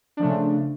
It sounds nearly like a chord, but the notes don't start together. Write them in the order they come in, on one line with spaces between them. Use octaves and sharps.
D4 F3 A3 C#3